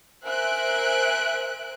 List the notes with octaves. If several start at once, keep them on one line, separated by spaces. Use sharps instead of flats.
A#4 C5 E5 G#5 F#6 D7